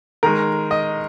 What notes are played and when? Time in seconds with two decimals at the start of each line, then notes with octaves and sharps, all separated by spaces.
0.23 D#3 G#3 A#4
0.71 D#5